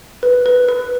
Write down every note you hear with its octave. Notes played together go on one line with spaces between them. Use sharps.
B4
B4
B4